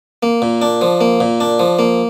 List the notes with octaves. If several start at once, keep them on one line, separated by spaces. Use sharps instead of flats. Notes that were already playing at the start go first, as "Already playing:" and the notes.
A#3
A#2
D4
F3
A#3
A#2
D4
F3
A#3